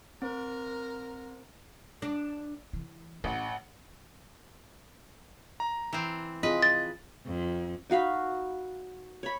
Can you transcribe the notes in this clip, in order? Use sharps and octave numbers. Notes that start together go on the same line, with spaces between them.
C4 A#4 C5
D4
E3
A1 C#4 F#5
A#5
E3 C4
C4 F4 G#4 B4 D#5
A6
F2
D#4 F#4 F5 B5
C#5 B5